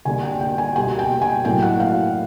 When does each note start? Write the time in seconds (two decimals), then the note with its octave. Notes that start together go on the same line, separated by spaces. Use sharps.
0.05 D3 G3 A#3 G#5
0.23 G5
0.41 G5
0.58 G#5
0.75 B2 G3 A#3 G#5
0.99 G5
1.22 G#5
1.45 A2 F#3 A#3 G5
1.63 F#5
1.80 F5